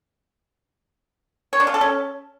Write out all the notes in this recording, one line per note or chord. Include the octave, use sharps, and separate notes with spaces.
C#5
D4
F4
A4
C#4